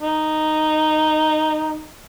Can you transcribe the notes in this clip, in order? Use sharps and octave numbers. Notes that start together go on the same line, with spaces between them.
D#4